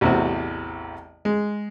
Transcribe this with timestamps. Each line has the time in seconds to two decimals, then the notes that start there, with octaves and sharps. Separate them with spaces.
0.01 A1 E2 C3 C4 F#4
1.25 G#3